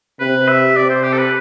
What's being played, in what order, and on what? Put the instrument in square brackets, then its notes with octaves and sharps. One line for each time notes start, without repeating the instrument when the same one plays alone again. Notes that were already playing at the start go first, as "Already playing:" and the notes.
[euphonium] C3 [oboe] B4
[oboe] E5
[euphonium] C3 [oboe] D5
[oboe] C5
G4
A4
B4